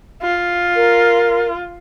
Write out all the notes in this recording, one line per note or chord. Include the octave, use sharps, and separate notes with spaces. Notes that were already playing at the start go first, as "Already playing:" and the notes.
F4
A#4